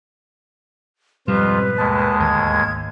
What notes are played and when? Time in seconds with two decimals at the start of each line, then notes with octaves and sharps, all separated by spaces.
1.28 F2 G#2 B2 F3 G3 F4 B4
1.78 D#2 G#3 A5
2.20 G#1 D2 G#6